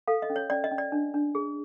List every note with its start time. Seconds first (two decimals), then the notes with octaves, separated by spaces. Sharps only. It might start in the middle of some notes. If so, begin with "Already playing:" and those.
0.08 A4 F5
0.22 D#5
0.30 C#4
0.36 C#5
0.50 C#4 D5
0.64 D#5
0.71 C#4
0.78 D5
0.92 D4
1.14 D4
1.35 G#4